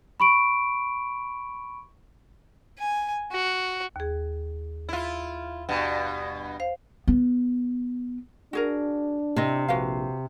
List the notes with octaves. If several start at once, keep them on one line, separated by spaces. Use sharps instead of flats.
B5 C#6 D7
G#5
F#4
D#2 G#4
E4 F4
G2 B2
C5 F5
B3
D4 F#4 G#4 A#4
C3 E4 D#5
A#1 F#4 B4 F5